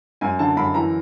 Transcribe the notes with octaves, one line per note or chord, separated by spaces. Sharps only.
F#2 G#5
D3 A5
F#2 B5
E3 A#5